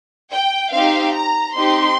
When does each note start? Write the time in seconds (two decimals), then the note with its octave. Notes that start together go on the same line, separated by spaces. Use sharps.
0.31 G5
0.72 C4 D#4 G4 F5
1.14 A#5
1.55 C4 D#4 G4 C6